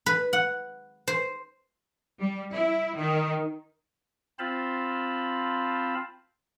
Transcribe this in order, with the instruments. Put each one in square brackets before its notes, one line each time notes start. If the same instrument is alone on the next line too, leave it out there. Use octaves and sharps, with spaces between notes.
[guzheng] B4
F#5
C5
[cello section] G3
E4
D#3
[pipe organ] C4 F4 C5 F5 A5 B5